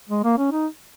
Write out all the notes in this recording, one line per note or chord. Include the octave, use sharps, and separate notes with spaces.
G#3
A#3
C#4
D#4